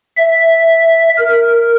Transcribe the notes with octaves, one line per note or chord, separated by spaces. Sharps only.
E5
A#4